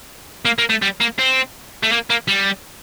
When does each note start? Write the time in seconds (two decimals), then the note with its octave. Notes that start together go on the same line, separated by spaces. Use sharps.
0.45 A#3
0.58 A#3
0.69 A3
0.82 G3
1.00 A#3
1.19 C4
1.83 A3
1.92 A#3
2.10 A#3
2.28 G3